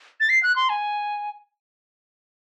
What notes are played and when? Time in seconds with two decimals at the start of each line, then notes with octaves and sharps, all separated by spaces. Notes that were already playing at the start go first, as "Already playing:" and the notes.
0.20 A6
0.29 C7
0.43 F#6
0.56 C6
0.69 G#5